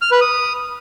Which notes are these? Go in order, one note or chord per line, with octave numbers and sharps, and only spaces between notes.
F6
B4
D#6